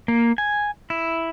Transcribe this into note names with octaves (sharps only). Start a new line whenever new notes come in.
A#3
G#5
E4